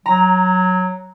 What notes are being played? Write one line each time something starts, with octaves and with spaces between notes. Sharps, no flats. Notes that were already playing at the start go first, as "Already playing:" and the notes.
F#3 A#5